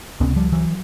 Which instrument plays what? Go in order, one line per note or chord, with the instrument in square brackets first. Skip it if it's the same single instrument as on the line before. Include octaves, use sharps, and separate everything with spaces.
[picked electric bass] C#2 C3 B3 C#4
F3 G3
E3 F#3